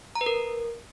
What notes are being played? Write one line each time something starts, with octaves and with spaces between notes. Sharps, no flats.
A#5
B4
A#4